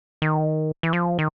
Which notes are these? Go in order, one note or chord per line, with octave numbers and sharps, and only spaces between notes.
D#3
E3
F3
D#3